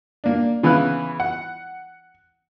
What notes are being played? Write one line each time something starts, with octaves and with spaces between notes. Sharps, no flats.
A#3 D4
C#3 E3 B3 E4 F5 F#6
F#5